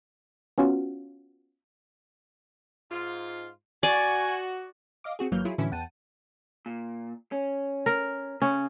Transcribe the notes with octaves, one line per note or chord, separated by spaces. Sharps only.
B3 C#4 F4 F#4
G#2 F4
F#4 D5 G#5
D#5 F5 D6
C4 F#4 G#4
G1 E3 F#3 A#3 F6 G6
F#3 E4 F4 G#4
A2 D3 E3 F#3 C#4 E4
E2 F#5 G5 A5 D#7
A#2
C#4
A#4
C#3 C#4